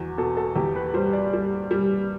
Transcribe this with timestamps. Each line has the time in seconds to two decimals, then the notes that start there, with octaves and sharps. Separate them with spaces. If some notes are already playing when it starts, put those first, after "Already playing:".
Already playing: E2 F#4
0.18 B2 A4
0.37 A4
0.56 E2 G4
0.76 B4
0.94 G3 C5
1.13 D5
1.33 G3
1.71 G3